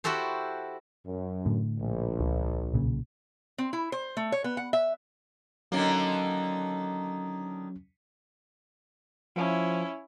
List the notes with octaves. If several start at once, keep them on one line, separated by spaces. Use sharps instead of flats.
E4 F#4 G4 A4 C5
F#2
A2 D3
A#1
C#2
B1 A#2 C#3
C4
E4
C5
A3
C#5
B3
F#5
E5
D3 D#3 F#3 A#3 C#4
F3 C#4 E4